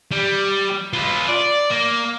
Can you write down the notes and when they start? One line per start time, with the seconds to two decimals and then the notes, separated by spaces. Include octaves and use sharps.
0.11 G3
0.93 F4 B4
1.28 D5
1.70 A#3